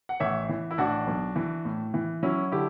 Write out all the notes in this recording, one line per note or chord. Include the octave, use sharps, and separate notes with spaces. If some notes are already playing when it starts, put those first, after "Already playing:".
F#5
A1 C#5 E5
E3
E4
A1 D4 F#4
B1
E3
A2
E3
F#3 C#4 E4
D3 E4 G4